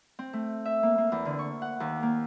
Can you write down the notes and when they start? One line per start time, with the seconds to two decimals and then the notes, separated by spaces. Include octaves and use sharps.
0.19 C4
0.33 A3
0.65 E5
0.83 A#3
0.98 A#3
1.12 E2
1.25 D3
1.39 C#6
1.62 F#5
1.80 D#2
2.03 A#3